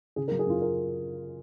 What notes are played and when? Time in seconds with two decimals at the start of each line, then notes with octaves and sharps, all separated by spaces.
0.16 C#3 G#4
0.28 A#4
0.31 F#3
0.39 G#4
0.46 F#2 F4
0.62 A#4